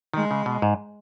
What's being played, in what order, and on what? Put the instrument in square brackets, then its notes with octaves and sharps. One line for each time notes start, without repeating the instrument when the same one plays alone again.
[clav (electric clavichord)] D#3 [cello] G#3
[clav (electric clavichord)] C#3
B2
G#2